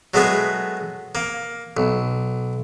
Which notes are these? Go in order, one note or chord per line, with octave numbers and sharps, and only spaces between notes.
F#3 G#3 A3 B3 G#4
A#3
B1